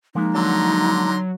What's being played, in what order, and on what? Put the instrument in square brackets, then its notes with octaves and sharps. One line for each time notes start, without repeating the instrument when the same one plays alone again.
[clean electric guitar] F3 G#3 A#3 [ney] D#4
[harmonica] D3 A#5 C6 [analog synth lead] F#3